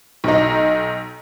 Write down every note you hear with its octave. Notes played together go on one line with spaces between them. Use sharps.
B1 D#4